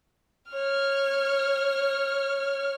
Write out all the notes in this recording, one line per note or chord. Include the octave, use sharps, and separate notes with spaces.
C#5 F6